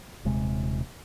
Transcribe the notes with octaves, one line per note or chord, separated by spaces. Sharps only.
D#1 C3 G#3